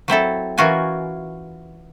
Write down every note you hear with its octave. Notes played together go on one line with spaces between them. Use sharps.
F#3 C4 E4 A4
E3 C#4 F4 F#4 A#4 G#5